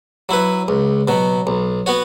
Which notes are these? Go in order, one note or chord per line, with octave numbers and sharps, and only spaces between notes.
F#3 E4 B4
C#2
B2 F#3
B1
B3 F#4 C#5